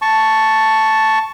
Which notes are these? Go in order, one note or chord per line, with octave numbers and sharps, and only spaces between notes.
A5 C#6